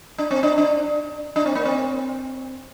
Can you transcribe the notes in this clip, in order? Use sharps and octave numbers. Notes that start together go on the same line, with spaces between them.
D4
C4
D4
D4
D4
C4
A#3
C4